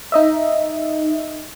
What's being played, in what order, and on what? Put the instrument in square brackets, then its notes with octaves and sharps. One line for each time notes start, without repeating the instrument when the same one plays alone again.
[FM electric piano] D#4 D#5 E5